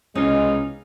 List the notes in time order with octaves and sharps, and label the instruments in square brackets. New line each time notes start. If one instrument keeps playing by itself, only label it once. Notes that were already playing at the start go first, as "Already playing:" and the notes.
[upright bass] C2 B2 [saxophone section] E3 D#4 F4 [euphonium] G#3 [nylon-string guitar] C#4